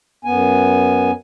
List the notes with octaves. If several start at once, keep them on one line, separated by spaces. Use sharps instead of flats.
F#2 B3 G#5